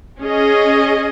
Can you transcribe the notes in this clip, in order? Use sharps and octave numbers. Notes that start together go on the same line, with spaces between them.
C#4 G#4 D#5